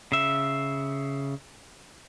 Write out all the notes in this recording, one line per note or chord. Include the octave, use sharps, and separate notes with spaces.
C#3 E5